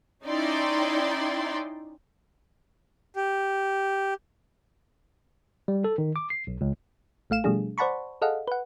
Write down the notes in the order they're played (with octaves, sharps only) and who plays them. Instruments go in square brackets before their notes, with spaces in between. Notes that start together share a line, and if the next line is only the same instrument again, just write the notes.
[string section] C#4 D#4 E4 D5 G5 C6
[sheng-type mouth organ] G4
[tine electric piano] G3
A4
D#3
D6
C7
B1
C#2
[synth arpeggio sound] A1 A3 F5 E7
B2 F3 G3 A3 D4 G#4
C5 D5 F#5 A5 B5 C#6
G#4 A4 D#5 F5 F#5
B4 F#5